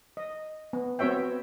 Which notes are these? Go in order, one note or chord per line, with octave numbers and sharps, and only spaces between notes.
D#5
B3
B3 C4 F#4 C#5 E5 G5